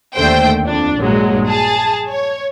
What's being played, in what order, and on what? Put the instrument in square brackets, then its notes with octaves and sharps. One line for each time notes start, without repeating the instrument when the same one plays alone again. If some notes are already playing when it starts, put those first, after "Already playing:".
[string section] D#2 D3 A3 C5 G5
F2 D4
A#1 G2 F#3 G#3
G#4 A5
C#5